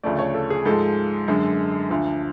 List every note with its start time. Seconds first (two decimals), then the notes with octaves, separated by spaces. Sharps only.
0.03 D2 C#3 F3 A3 D5
0.19 C#5
0.35 A4
0.50 G#4
0.65 G#2 F3 G#3 A4
1.28 F#2 D3 G#3
1.89 D2 D3 F3